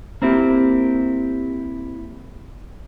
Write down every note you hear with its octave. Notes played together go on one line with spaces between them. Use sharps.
A#3 C4 E4 G4